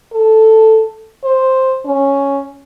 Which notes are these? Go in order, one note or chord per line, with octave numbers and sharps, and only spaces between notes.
A4
C5
C#4